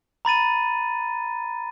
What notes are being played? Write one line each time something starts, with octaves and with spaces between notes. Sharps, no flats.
A#5 B5 A6 D#7